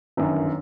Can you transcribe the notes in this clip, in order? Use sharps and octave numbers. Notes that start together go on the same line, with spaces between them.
G1 F#2 D#3